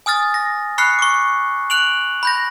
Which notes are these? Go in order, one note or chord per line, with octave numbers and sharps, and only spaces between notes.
G#5 D#6 F6 A6
A#6
B5 C#6 F6 F#6 C7 C#7
C#6 D6
F#6 D7 F7 F#7
B5 G6 A#6